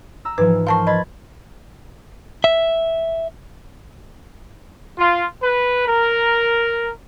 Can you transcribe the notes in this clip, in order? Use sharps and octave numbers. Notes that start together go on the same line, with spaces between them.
A#5 E6
G#2 E3 F3 B4
A#4 C5 F5 A5 C6 C#6
D#5 B5 G#6 A6
E5
F4
B4
A#4